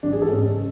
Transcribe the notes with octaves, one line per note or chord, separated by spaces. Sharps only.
A1 D4
G#4
G#2 A4
C#4
F#1